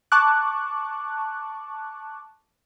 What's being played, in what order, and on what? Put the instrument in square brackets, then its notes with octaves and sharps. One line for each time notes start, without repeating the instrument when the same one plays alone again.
[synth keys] A5 C#6 D6 F#6